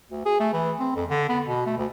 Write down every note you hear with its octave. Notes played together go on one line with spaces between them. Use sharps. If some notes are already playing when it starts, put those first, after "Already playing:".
D2
G#4
A3
E3
C4
F2
D3
B3
B2
A3
D2